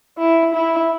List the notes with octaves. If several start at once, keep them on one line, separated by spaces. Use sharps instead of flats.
E4
E4